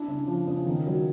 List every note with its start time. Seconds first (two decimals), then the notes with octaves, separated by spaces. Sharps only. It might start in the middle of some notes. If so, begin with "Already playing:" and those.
Already playing: D4 E4
0.08 C#3
0.27 F3
0.47 C#3
0.67 D#3
0.87 F#3